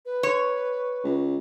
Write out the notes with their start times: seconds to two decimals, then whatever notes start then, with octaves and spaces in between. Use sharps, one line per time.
0.06 B4
0.23 C#5
1.03 C#2